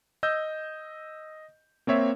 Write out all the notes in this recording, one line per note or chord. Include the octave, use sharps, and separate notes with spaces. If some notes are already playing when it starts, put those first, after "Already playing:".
D#5 E6 G6
A#3 C4 C#5 E5